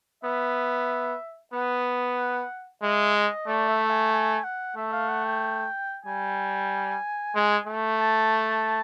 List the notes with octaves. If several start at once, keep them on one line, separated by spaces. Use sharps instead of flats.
B3 E5
B3 F#5
G#3 E5
D#5
A3 D5
E5
G#5
G#5
F#5
A3 E5
F5
F#5
G5
G3 G#5
G#3
A3
A5